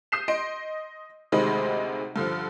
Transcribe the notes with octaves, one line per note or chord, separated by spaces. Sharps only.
D#6 G6 C7 E7
D#5 C6 D7
D2 C3 D#3 G#3 D#5 B5
G2 D3 F3